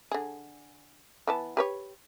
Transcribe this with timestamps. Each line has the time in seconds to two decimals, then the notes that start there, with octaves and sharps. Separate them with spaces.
0.11 D3 G#4
1.27 E3 B3 A5
1.57 G4 B4 C#5